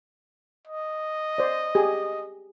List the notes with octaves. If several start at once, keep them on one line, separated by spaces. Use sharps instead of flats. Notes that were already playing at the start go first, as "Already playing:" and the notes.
D#5
C5 D5
G4 G#4